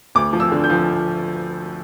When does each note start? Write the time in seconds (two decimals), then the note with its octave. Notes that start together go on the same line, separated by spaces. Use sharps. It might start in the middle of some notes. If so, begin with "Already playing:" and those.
0.15 D2 D6
0.33 F3
0.40 E6
0.52 D3
0.64 G6
0.70 F3